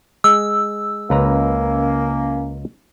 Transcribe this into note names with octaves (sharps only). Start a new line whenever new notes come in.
G#3 E6
C#2 A#3 C#4 B4 A#5